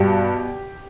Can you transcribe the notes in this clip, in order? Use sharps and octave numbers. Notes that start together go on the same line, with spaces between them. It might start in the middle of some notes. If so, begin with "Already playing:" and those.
Already playing: G2 B2 G4